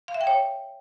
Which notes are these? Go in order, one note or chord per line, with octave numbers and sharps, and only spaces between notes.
F5
E5
G5
C#5